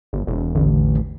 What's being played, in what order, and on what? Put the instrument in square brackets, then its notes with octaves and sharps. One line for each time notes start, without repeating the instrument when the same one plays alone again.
[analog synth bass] G1
E1
[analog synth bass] A1 [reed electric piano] E2 D3